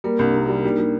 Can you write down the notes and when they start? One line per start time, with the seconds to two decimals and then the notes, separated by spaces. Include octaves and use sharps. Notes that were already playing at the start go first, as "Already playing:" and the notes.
0.04 G3 A#3 A#4
0.19 C2 D4
0.34 C3 D#4
0.48 G3
0.64 G3
0.78 G3